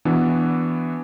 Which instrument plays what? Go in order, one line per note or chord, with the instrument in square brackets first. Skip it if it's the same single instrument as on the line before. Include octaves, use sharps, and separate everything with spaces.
[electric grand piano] E3 B3 D4 F#4